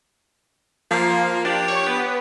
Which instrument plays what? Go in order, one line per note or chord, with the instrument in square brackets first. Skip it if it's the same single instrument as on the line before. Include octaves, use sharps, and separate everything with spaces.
[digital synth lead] F3 [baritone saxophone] A#3
[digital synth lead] D4 [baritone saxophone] G4
[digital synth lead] C#5
B3